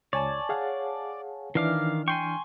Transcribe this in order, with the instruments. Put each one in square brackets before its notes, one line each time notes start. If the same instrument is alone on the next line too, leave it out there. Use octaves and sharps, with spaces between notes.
[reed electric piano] C#2 [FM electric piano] C#5 G#5 A5 [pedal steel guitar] D5
[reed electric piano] G#4 F5 F#5
[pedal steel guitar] D#3 F5 D6 [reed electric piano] E3 D4 F6
[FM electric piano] G5 [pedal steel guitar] G#5 C6 C#6